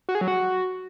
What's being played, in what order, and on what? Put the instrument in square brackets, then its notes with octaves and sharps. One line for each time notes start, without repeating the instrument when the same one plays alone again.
[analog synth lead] F#4
G#4
F#3
F#4